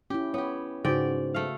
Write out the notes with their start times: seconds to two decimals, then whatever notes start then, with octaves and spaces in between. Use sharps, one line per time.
0.10 C#4 E4 G4
0.34 B3 G4 C#5
0.85 G#2 C#3 F#4 D5 G5
1.34 A3 F5